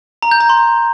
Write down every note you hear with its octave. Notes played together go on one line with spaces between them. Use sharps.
A#5
G6
A#5
C6